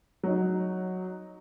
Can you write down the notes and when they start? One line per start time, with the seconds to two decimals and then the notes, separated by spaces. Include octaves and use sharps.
0.23 F#3 D#4